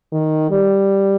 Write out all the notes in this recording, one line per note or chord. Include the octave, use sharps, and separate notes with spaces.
D#3
G3